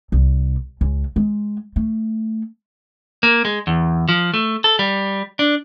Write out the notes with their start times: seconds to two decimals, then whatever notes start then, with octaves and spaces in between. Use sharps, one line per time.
0.12 C2
0.81 C#2
1.16 G#3
1.76 A3
3.23 A#3
3.45 G#3
3.67 E2
4.09 F3
4.34 A3
4.64 A4
4.79 G3
5.39 D4